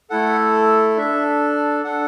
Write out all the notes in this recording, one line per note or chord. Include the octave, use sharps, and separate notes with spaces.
A3 E4 A4 F#5
D4 A4 E5
D4 A4 F#5